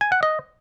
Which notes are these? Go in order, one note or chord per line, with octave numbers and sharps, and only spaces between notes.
G#5
F#5
D#5